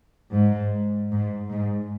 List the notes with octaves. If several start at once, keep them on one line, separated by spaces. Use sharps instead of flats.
G#2
G#2
G#2